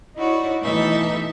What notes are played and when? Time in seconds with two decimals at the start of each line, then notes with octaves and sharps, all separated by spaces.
0.16 D#4 E4 F#4 C#5 D5
0.62 B2 E3 A3 D#4 A4 E5